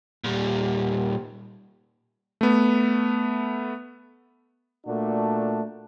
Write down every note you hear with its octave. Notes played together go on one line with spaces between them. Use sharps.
A#2 G3
A3 B3
A#2 A3 D4 F#4